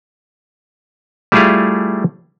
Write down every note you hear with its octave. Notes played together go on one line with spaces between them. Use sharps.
G3 A3 E4 F4 G#4 F5